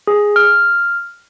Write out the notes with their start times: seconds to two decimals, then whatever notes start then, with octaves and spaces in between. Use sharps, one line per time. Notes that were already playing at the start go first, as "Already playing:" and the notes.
0.07 G#4
0.36 F6